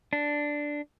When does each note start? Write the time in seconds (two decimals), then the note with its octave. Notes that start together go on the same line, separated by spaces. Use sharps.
0.13 D4